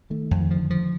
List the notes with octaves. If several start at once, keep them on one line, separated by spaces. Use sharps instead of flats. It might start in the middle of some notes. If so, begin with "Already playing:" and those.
D#3 A3
D#3
F2
D#3
F3
D3
F3